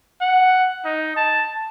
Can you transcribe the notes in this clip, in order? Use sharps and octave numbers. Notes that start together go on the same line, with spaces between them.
F#5
D#4
A5